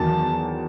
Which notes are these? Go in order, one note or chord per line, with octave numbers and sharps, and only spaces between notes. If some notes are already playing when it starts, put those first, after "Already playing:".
Already playing: E2 D#3 F#3 A5